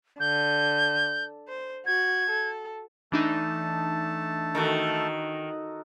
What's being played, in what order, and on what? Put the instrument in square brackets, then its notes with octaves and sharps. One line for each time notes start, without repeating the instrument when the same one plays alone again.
[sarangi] D3 [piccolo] G6
[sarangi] C5
[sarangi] F#4 [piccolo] G#6
[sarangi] A4
[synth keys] E3 D4 D#4 [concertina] A3 A5
[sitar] D#3 [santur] F#4 A4 A#4